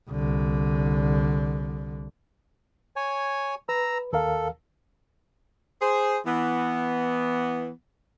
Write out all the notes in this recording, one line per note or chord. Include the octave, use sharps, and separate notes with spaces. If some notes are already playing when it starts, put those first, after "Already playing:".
C2 D3
C#5 G#5
B4 A#5 E6
D#2 A4 A#4 F5
G#4 C5
E3 B3